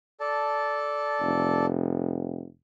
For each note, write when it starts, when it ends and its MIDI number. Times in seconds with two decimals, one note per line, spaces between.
0.20 1.66 69
0.20 1.66 74
0.20 1.66 81
1.20 2.45 29